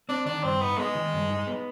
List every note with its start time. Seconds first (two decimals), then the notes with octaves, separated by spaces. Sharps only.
0.09 C4 D4
0.26 D#3 D4
0.44 G2 C4
0.61 B3 D#4
0.78 G#3 B3
0.95 D#3
1.13 G2
1.30 D#4
1.47 B3